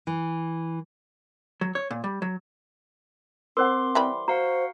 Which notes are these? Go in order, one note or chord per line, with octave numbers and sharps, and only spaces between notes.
E3
F#3
C#5
A#2
G3
F#3
C4 A#4 C5 F#5 C6 D6
E3 G3 B5
F#4 C5 F5 F#5 A#5